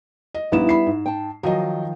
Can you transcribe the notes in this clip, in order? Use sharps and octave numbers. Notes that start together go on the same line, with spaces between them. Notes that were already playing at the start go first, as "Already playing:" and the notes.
D#5
A#1 G3 B3 D#4 E4 E7
B5 C7
G#2
G5 A5
D#3 F3 F#3 D#5